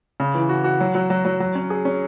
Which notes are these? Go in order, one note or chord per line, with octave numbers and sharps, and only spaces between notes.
C#3
E3
F#4
F#4
F#3
F#3
F#3
F#3
F#3
C#4
G#4
C#4